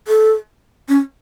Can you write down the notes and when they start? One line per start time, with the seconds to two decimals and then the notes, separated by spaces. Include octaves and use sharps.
0.08 A4
0.89 C#4